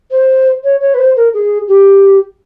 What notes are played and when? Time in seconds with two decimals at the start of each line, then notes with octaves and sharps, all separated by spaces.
0.11 C5
0.64 C#5
0.80 C#5
0.94 B4
0.99 C5
1.17 A#4
1.34 G#4
1.68 G4